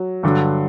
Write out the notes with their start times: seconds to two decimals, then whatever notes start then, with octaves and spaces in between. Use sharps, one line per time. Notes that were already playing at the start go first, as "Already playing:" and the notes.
Already playing: F#3
0.23 G2 D3 F#3